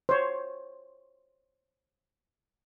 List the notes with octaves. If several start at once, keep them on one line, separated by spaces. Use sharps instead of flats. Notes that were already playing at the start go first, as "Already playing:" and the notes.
C5 C#5